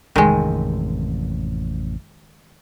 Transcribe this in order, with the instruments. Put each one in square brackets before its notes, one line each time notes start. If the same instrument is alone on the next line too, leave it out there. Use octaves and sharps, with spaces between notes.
[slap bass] A1 F2 C3 [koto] D#3 G#3